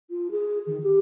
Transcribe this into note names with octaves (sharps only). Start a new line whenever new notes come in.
F4
G#4
D#3
G4